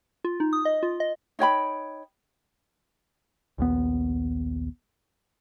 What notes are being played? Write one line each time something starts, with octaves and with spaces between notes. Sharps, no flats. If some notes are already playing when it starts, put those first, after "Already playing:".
F4
D#4
D#6
D#5
F4
D#5
D#4 C#5 G5 B5
A#1 D#2 B3